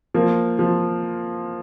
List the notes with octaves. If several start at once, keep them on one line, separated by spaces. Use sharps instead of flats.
F3 A#3
F3